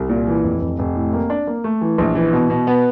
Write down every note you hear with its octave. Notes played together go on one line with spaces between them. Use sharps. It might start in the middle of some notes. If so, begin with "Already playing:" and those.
Already playing: C2
A#2
E3
F1
F1
F1
A2
A#3
D4
A#3
A3
E3
A#1
E3
B2
B2
B3